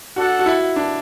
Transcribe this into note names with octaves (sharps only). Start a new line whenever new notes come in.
D4 F#4 A4 F#5
F#4
E4
D4